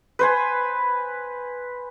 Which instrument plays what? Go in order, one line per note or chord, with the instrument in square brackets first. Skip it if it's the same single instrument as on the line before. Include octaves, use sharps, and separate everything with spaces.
[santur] B4 C5 G#5